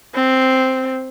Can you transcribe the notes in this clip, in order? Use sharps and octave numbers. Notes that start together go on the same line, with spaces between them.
C4